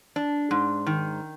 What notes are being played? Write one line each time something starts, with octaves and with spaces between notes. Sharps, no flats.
D4
G#2
D#3